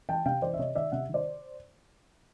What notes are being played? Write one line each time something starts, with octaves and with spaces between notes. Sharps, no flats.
E3 G5 A5
C3 F5 G5
E3 C5 D5
E5
C3 C#5 D#5
D#3 D5 E5
C3 E5 F#5
D#3
C5 D5